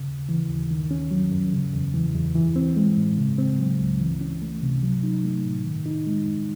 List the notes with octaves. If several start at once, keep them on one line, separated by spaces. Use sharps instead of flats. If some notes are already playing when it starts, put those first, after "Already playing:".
Already playing: C#3
D#2
E3
D#2
D#3
C#4
F#3
F#2
C#3
E2
E3
E2
E3
C4
G#3
A2
C#3
C4
F#3
C#2
E3
C#4
A3
C3
F#3
D#4
A3
A2
D#3
D#4
G#3
F#2